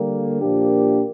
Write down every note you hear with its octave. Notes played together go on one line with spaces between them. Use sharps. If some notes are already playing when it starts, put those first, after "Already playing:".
Already playing: D3 G3 A#3
A#2 F3 A#3 D4 G4